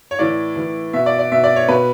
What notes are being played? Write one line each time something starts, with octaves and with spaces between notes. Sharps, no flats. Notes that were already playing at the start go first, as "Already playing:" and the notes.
C#5
A2 E3 D5
A2 E3
B2 E5
D5
D5
B2 E5
D5
C#5
B2 B4